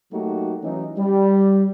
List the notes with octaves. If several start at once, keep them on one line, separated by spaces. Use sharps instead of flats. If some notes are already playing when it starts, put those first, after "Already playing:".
F#3 A3 A#3 D#4 F#4 G4
E3 F#3 C#4 D#4
G3